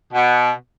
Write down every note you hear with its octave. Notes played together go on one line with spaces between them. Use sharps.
B2